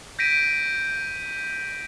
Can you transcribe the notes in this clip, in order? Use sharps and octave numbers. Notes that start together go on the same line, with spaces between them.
G6 A#6 B6 D7 D#7